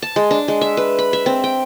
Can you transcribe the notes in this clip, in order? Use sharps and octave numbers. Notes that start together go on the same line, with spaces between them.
A5
G#3
D4
G#3
E5
B4
B5
E5
C4
G5